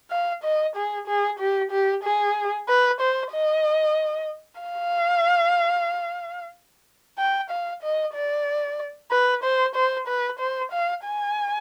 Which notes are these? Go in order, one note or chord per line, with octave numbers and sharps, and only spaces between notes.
F5
D#5
G#4
G#4
G4
G4
G#4
B4
C5
D#5
F5
G5
F5
D#5
D5
B4
C5
C5
B4
C5
F5
G#5